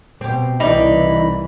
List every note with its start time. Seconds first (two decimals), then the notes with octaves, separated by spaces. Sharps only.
0.21 B2 C4 G4
0.60 C2 E3 D#4 G4 D5 B5